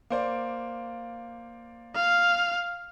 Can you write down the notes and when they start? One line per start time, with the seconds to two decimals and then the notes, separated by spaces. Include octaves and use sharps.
0.10 A#3 C5 D5
1.95 F5